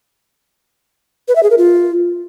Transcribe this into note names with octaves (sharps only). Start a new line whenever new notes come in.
B4
E5
G#4
A#4
F4